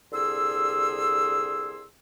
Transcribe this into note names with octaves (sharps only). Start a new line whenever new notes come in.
C2 D3 G#4 C6 E6